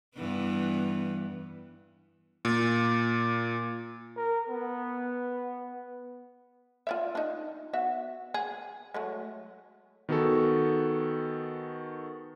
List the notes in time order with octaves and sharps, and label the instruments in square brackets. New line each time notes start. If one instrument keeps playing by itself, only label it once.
[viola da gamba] G2 E3 B3
[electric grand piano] A#2
[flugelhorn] A#4
B3
[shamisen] F4 D5 E5
D4 D#4
B3 F#4 E5
G#4
F#3 G#3 A3
[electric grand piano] D#3 B3 F#4 G#4 A4